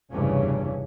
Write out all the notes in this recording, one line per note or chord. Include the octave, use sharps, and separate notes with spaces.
F1 E2 G2 C#3 E3 C#4